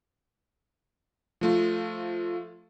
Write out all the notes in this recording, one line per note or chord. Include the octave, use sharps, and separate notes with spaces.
F3 A3 F4